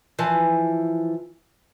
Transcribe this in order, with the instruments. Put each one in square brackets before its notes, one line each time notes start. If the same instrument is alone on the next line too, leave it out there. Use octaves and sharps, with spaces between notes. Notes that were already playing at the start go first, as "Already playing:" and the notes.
[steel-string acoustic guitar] E3 F3